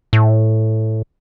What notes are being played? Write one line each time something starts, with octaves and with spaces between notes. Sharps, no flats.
A2